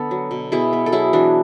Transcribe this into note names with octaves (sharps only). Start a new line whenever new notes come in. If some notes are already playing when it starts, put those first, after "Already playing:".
Already playing: D3 B3 A4
F#3
B2
B2 E4 G#4
B3
A4
F#3 E4 G#4
E3 D4 F#4